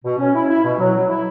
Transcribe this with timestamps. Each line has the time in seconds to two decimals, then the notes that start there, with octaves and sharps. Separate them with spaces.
0.04 B2
0.18 C#4
0.34 E4
0.48 E4
0.64 B2
0.79 F#3
0.94 F#3
1.09 E4